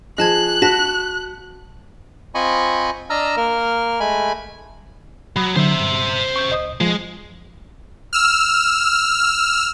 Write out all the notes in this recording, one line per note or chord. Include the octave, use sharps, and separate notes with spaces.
F3 G#4 D#5 A5 F#6 G#6
F#4 A5 A#6 B6
C4 F4 D#5 G#5 B5 C#6
D4 D#5 A5 A#5 E6 F6
A#3 A#4 F6
G#3 A3 G#5 B5
F#3 B5 D#6
D3 F#3 C5 E5
G2
C#6 G6
C#2 D#5 D#6
F3 G#3
E6 F6